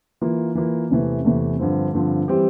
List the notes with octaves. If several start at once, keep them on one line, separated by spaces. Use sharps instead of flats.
E3 A#3 F4
E3 A#3 F4
E2 C3 E3 A3
E2 C3 E3 A3
G2 D3 F3 C4
G2 D3 F3 C4
E3 G3 C4 G4